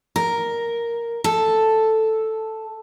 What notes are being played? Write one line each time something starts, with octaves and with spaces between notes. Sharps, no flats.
A#4
A4